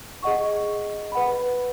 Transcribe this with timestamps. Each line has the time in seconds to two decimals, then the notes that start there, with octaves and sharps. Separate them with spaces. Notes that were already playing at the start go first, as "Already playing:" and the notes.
0.23 G#4 D#5 F#5 C#6
1.12 B4 F#5 B5